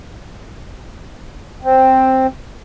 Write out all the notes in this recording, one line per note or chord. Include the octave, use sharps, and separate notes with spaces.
C4